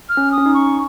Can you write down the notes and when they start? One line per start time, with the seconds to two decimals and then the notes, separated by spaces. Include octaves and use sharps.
0.09 F6
0.17 C#4
0.32 D#6
0.38 C#4
0.46 D#4
0.54 C#6